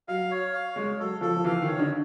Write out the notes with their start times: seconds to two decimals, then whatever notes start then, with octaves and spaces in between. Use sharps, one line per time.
0.08 F#3 F5
0.31 C#5
0.53 F5
0.76 G#3 C#5
0.99 F#3 A4
1.21 F3 A4
1.37 F3
1.44 E3 F5
1.62 D#3
1.67 C#5
1.79 D3